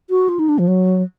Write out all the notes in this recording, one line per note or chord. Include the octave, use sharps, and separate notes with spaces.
F#4
F4
D#4
D4
F3
F#3